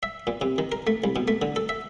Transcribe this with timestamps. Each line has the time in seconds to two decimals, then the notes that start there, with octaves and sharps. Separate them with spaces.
0.03 E5
0.27 A#2
0.41 C3
0.58 D#3
0.72 A#4
0.87 A3
1.04 C2
1.16 B2
1.28 A3
1.42 D3
1.56 A4
1.69 E5